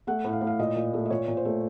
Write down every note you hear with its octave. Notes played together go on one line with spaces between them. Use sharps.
A3 F#5
A2
F5
A2
F5
A#2 D#5
A#2
A3
D#5
A#2 C#5
A#2
C5
A3